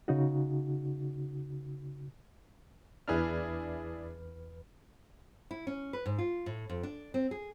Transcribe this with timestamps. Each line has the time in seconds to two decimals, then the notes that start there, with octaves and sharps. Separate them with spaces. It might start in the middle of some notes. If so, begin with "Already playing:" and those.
0.08 C#3 D#4 F#4
3.08 E2 D4 E4 G#4 B4 F6
5.51 E4
5.67 C#4
5.93 B4
6.06 G#2
6.18 F4
6.46 A2
6.69 F2
6.83 D4
7.14 C4
7.31 G#4